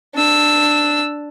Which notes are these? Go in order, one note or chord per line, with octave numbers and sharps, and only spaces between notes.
D4 E6